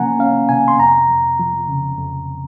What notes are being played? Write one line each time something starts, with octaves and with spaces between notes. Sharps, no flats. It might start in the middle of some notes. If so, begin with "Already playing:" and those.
Already playing: C3 F3 A#3 C#4 F#5 G#5 A#5
C#4 F5
C3 G#5
C6
F2 A#5
F2
F3
C#3
F2